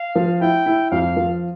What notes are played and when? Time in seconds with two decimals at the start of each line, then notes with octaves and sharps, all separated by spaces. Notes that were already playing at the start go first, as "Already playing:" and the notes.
Already playing: F5
0.15 F3
0.41 E4 G5
0.66 E4
0.91 F2 F5
1.16 F3